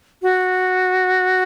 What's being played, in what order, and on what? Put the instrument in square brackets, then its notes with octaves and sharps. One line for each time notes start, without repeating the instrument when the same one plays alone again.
[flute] F#4